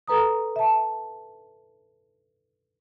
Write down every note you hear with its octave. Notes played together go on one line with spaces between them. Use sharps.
A4 B4 A#5 D#6
E5 A5